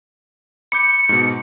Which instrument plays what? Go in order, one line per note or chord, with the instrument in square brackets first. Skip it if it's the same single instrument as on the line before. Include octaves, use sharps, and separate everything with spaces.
[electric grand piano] B5 D6 G6 [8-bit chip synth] C#7
[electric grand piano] G#2 B2